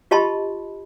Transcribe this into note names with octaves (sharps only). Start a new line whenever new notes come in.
F4 G4 D#5 A5 B5 C6